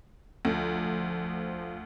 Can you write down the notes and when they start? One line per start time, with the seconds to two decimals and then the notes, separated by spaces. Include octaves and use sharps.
0.45 D2 F3